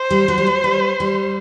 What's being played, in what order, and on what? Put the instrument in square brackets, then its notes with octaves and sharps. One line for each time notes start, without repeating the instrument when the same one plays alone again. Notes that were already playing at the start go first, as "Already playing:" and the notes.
Already playing: [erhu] C5
[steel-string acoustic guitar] G3
F#3
G3
F#3
G3
G3